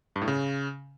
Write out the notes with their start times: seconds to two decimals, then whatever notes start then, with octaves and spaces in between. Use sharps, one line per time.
0.16 G2
0.22 A2
0.28 C#3